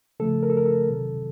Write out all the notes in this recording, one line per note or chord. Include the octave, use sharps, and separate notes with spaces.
C#3 F3 A3 A4
A#4
A4
A#4
A4
C3 D#3 F#3